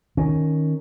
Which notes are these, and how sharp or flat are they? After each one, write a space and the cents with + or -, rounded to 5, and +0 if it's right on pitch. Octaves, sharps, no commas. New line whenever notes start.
D#3 +0 C#4 +0